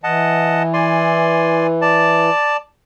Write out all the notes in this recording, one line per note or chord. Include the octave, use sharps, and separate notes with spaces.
E3 D#5 F#5 A5
D5 G#5 C6
D5 A5